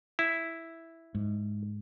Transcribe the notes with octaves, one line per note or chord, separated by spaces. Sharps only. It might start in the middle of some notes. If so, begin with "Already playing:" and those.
E4
G#2